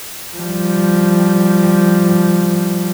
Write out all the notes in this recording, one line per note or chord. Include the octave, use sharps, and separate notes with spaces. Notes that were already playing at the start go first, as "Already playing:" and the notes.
F3 G3